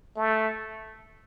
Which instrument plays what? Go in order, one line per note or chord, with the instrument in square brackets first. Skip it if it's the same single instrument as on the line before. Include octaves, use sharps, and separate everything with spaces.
[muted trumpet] A3